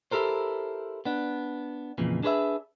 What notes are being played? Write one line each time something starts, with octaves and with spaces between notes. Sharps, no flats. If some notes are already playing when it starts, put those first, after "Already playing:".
E4 G4 A4 A#4 C5
B3 D4
F2 A#2 C#3 E3
D4 G#4 B4 C5 E5